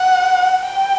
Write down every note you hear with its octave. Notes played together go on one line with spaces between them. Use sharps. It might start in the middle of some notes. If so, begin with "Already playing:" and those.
Already playing: F#5
G5